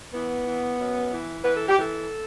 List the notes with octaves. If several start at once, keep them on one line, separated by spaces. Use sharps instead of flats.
E3 B3
E3
F#2
E3
E3 B4
A4
G4
E3 A4